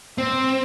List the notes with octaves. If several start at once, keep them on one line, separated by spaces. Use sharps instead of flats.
C4